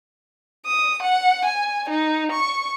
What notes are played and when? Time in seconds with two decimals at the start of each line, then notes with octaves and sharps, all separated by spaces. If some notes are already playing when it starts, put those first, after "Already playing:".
0.66 D#6
1.02 F#5
1.45 G#5
1.90 D#4
2.32 C#6